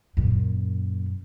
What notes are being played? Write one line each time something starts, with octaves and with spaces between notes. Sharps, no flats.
F#2 A#2